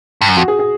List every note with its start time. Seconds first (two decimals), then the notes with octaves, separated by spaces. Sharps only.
0.21 G2
0.29 F#2
0.37 F2 F#4
0.48 G#4
0.59 G#4